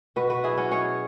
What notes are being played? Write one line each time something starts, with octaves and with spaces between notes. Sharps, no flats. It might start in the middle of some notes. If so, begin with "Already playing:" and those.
B2 F#4 B4
F#4 B4
F#3 E4 G#4
C#4 F#4
B2 G#4 C#5